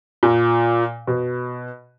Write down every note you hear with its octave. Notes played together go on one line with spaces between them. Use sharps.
A#2
B2